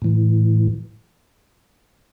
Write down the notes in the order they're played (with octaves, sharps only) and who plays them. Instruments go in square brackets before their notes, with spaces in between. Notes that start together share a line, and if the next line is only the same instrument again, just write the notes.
[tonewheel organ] A2 E3